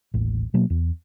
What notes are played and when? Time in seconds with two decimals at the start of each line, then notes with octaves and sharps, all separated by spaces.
0.14 D#1 A1
0.54 B2 F#3 A#3
0.70 E2